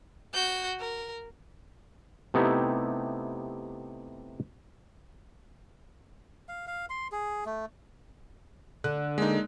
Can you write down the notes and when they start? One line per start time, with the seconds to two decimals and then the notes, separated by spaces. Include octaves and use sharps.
0.34 F#4 G6
0.79 A#4
2.34 C3 A3 B3 D#4 E4 G4
6.49 F5
6.67 F5
6.90 C6
7.12 G#4
7.46 A3
8.84 D3 F#6
9.18 G#3 A#3 D#4